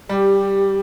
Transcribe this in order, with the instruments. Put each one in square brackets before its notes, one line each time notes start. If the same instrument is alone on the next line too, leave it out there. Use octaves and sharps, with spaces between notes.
[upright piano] G3 [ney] G4